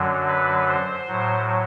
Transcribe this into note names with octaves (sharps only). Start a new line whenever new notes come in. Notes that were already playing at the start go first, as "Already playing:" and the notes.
Already playing: F#2 D3 F#3
B4
C5
A2 F#3